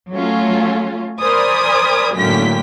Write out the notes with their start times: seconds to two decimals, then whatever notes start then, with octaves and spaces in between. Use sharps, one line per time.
0.13 F#3 A3 C#4 F4
1.21 A#4 C5 D5 G#5 B5 D#6
2.17 F#2 A2 D3 A#3 G5 B6